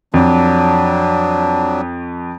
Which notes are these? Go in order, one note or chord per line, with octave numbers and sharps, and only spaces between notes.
F2 F#3 D4